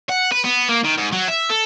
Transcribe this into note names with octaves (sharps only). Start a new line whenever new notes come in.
F#5
B4
B3
A#3
D#3
G#2
F#3
E5
A4